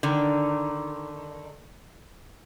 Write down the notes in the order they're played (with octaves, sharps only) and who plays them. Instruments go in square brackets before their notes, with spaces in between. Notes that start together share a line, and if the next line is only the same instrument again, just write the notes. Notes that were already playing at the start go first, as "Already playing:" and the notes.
[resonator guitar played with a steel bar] D3 D#3